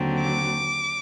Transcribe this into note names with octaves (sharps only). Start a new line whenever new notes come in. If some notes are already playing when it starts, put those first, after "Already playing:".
Already playing: D#2 D3 F#3 C4
D6